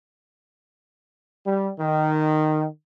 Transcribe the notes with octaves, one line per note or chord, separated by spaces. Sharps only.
G3
D#3